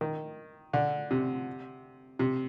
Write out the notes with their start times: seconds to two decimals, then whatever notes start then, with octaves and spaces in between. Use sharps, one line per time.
0.01 D#3
0.73 D3
1.11 C3
2.19 C3